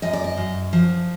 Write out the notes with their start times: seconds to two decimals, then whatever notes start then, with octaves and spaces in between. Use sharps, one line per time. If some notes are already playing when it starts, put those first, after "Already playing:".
0.02 F#2 D#5
0.13 D5
0.24 D#5
0.37 F#2
0.73 F3